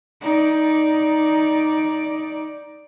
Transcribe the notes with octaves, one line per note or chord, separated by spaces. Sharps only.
D#4 D5